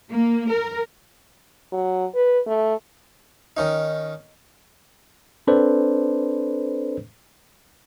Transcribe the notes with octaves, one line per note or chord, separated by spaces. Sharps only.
A#3
A#4
F#3
B4
A3
D#3 C#4 D#4
C4 D4 A4 B4 C5 D5